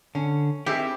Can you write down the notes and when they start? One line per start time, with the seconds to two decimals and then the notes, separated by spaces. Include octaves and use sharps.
0.15 D3 C#4
0.66 D#3 C4 E4 G4 G#4 E5